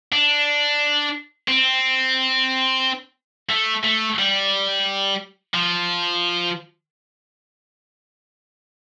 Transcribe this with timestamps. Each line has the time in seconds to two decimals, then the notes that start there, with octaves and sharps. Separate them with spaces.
0.12 D4
1.48 C4
3.50 A3
3.84 A3
4.19 G3
5.54 F3